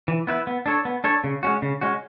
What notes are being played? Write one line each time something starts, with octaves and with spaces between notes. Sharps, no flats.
E3
B3 E4 B4
B3
D4 A4 C#5
B3
D4 A4 C#5
C#3
G#3 C#4 F#4
C#3
G#3 C#4 F#4